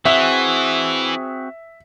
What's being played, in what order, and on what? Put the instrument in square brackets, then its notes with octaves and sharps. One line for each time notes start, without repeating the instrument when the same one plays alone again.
[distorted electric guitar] E3 [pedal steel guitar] C4 F#4 G#4 [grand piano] E5